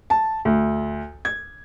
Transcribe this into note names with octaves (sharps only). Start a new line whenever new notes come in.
A5
D2
G#6